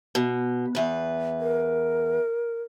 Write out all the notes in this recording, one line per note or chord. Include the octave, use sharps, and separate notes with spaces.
B2
E2 B4
A#4